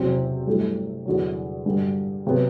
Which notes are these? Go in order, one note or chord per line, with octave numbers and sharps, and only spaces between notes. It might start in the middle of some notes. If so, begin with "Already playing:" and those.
Already playing: F#1 E2 C3 F#3 C4
G2 F#3 A3 E4 G4
E2 D3 F#3
G2 D3 G3
C3 F#3 B3